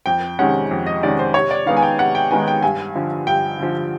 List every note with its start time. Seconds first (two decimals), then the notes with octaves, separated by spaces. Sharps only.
0.06 F2 G5
0.39 C3 D#3 G#3 C#4 F#5
0.71 F2
0.86 D#5
1.02 C3 D#3 G#3 C#4 D5
1.19 C5
1.34 C3 C#5
1.51 D5
1.66 D#3 G#3 B3 D#4 F5
1.77 G#5
1.82 G5
1.99 C3 F#5
2.15 G5
2.31 D#3 G#3 B3 D#4 G#5
2.48 G5
2.63 G2 G#5
2.95 D3 F3
3.27 G2 G5
3.59 D3 F3